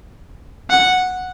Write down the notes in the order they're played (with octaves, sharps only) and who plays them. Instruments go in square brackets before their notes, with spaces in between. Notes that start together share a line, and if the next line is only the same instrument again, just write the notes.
[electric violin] F#5